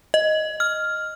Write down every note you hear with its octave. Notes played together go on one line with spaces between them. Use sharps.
D#5
F6